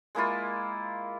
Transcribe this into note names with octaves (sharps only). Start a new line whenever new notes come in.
G#3 A#3 E4 F4